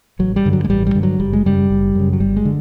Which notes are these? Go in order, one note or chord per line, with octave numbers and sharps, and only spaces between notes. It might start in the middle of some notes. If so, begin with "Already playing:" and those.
A1 F#3
G3
G2 D3
F#3
G#3
A1 G3
G3
G2 D3
F#3
F#1 G3
G#3
F#2 C#3 G3
F#1
F#2 C#3
F#3
G1 G3
G#3
D3